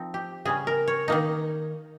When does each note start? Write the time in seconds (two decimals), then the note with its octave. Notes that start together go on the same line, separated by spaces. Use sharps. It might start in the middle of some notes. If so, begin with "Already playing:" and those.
Already playing: F3 C4 D#4
0.14 G4
0.45 C#3 G3 C#4 G#4
0.67 A#4
0.88 C#5
1.08 D#3 A#3 D#4